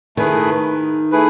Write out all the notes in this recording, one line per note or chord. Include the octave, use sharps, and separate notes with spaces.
D#3 A3 E4 G#4 B4
A3 E4 G#4 B4